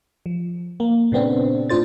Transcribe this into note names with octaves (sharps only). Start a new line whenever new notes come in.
F3
A#3
A#2 C#3 B3 C4 D4
A2 D4 F4 C5 A6